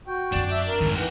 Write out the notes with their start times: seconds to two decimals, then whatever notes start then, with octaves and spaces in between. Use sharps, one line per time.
0.07 F#4 G5
0.32 F#2 C4 D4
0.51 E5
0.67 A#4
0.81 F2 G#2 D#3 F4
0.95 E3 F#4 G5